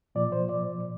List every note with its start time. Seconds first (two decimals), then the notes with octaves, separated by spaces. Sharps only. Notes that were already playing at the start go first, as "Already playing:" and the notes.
0.15 A#2 F3 D5
0.32 C5
0.49 D5